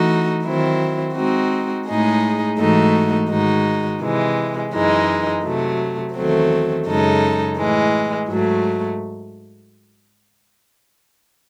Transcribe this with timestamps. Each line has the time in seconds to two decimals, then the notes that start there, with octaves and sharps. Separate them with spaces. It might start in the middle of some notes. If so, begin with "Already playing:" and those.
Already playing: E3 A3 D#4 F#4
0.44 D#3 F#3 C4 E4
1.15 G#3 C4 D#4 F#4
1.86 A2 G#3 D#4 G#4
2.57 G#2 E3 A3 D#4 F#4
3.29 G#2 D#3 G#3 D#4 F#4
4.00 C3 E3 G#3
4.72 F#2 E3 G#3 D#4
5.43 C3 F#3 A3
6.15 E2 D#3 F#3 A3 C4
6.86 F#2 C#3 G#3 D#4 A4
7.57 A2 E3 G#3
8.28 G#2 F#3 A3